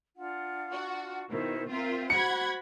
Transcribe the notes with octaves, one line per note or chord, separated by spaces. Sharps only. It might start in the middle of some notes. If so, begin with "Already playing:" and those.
D4 F4 F#5
F#4
B2 D#3 D#4 E4 C5
C4 F4 A#4 E5
F#4 C5 F#5 B5 G#6 C#7